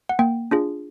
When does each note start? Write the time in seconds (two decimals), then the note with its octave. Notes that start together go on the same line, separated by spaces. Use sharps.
0.09 F#5
0.19 A#3 G5
0.51 D4 F4 G#4